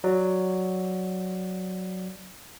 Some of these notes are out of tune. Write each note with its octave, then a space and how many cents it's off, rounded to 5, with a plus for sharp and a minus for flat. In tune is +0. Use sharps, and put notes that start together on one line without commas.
F#3 +0 D5 +0